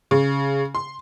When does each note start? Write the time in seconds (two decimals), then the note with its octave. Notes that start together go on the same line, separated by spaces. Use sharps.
0.11 C#3
0.75 C6